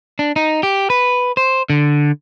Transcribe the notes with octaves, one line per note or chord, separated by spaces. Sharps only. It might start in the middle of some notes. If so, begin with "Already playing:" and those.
D4
D#4
G4
B4
C5
D3